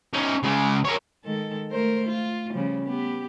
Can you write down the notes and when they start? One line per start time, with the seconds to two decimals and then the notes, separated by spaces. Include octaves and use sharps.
0.13 C#4 D#4
0.43 C#3 G#3
0.85 A#4 C#5
1.25 D#3 G#3 A4
1.71 A3 A#4 C5
2.07 F4
2.52 C#3 F3 G3
2.85 B3 G4